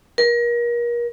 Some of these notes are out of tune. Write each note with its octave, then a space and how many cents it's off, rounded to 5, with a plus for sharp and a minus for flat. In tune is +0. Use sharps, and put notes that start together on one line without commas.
A#4 +35